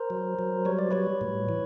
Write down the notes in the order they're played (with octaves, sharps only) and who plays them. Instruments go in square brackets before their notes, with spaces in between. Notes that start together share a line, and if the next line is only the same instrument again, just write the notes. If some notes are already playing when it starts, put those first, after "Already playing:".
Already playing: [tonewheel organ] A#4 C5
F#3
F#3
G3 C#5
D5
G3 B4 C#5
A2
E3